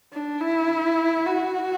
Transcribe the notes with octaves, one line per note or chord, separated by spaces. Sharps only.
D4
E4
F#4